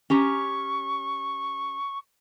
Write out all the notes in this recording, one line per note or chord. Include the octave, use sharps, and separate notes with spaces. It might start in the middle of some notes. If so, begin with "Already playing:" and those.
C#4 G4 A#5 C#6